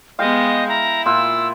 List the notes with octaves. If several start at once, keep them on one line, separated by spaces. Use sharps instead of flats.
G#3 B3 D#5 F5 G5
E4 A#5
A#2 F4 E6